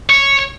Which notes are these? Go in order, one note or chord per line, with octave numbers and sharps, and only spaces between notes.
C#5